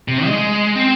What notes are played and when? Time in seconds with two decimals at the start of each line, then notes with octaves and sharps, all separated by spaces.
0.08 C3
0.26 G#3
0.76 C4